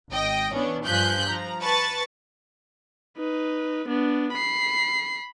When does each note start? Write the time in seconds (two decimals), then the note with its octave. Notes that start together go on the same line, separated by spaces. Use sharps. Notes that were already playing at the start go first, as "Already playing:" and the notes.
0.11 G#1 D#5 G5
0.54 E3 B3 C#4 D4
0.85 G2 F3 G#5 F#6 G6 B6
1.28 F3 A#5
1.61 B4 A5 C#6 A6
3.18 D#4 B4
3.87 B3 D4
4.33 B5 C7